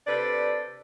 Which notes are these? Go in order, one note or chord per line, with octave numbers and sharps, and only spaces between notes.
C3 D4 A4 B4 D5